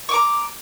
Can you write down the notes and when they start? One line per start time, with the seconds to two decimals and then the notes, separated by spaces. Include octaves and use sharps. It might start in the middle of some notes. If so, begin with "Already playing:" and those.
0.09 C#6
0.11 D6
0.14 A#5